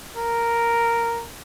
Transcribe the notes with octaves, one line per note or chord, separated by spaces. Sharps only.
A#4